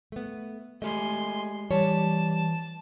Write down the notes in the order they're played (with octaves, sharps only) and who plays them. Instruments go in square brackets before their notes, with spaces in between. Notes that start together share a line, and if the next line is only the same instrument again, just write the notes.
[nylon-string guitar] A3 B3
[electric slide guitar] G#3 G4 D#5 [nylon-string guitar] A3 [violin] G#5 C6
[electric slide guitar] E3 [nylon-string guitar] G3 C#5 [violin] A5